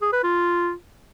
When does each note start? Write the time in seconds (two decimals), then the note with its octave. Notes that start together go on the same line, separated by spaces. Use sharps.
0.02 G#4
0.13 B4
0.24 F4